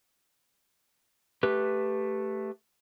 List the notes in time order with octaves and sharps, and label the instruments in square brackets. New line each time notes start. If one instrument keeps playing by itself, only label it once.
[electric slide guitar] A3 G4 B4